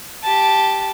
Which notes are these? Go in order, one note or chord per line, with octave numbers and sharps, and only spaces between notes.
G4 A5